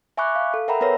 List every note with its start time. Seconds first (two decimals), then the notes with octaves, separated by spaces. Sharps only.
0.17 E5 G#5 B5 C#6 D6 F#6
0.35 F5
0.54 A4
0.68 A#4 E5 F#5 G5 A#5 B5
0.81 B3 A#4 B4 C#5 A#6